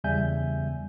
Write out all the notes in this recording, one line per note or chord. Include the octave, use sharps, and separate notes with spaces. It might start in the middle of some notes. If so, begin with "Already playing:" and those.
E2 C#3 G3 E5 G#5 G6